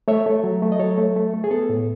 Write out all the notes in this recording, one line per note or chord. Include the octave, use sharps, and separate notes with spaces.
A3 C#5 E5
A3
F#3
A3
D#5
F#3 A4 C#5
A3
A3
A3
G#4
B3 A4
A2